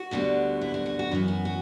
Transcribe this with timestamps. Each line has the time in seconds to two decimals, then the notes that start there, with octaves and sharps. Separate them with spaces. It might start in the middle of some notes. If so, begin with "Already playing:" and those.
Already playing: F#4
0.11 D2 D3 G3 B3
0.61 E4
0.74 F#4
0.86 F#4
0.99 F#4
1.11 F#2 E3 B3
1.28 F#4
1.45 F#4